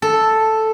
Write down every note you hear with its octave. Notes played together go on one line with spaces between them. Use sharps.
A4